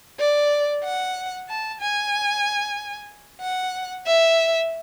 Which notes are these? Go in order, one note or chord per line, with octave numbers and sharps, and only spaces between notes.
D5
F#5
A5
G#5
F#5
E5